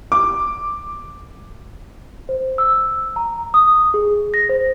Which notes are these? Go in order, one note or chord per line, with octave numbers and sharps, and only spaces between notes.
D6
C5
E6
A#5
D#6
G#4
A#6
C5